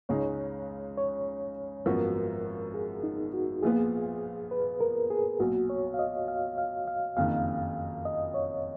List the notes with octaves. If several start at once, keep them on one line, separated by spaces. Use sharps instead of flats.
C#2 C#3 G#3 D#4 C#5
C#5
G#1 F#2 F3 B3 F#4 A#4
G#4
D#4
F#4
A#1 A#2 F3 B3 F4 G#4
B4
A#4
G#4
B1 A#2 F#3 F#4
C#5
F5
D#5
F5
F5
F5
F#1 F2 D#3 F5
D#5
C#5